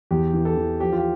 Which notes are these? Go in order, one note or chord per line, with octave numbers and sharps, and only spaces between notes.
E2 G4
E3
A4
E3
F3 G4
F4
G4